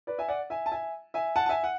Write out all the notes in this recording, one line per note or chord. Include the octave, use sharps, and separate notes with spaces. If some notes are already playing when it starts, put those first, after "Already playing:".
B4 D5
E5 G#5
D5 F#5
E5 G#5
A5
E5 G#5
E5 G#5
F#5 A5
A5
E5 G#5
F#5